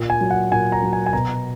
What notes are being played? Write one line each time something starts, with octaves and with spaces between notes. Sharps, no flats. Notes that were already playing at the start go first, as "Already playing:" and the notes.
Already playing: A#2
G#5
F#3
F#5
A#2 G#5
A#5
F#3
G#5
G#5
B2 A#5